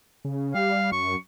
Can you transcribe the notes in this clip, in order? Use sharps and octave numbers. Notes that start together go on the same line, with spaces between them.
C#3
G3 F5
F#2 C#6